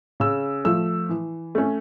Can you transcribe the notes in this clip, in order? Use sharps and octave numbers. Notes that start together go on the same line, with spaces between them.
C#3 E6
F3 A3 E6
E3
A3 C#4